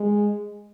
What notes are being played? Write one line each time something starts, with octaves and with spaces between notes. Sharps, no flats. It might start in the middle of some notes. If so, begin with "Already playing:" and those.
Already playing: G#3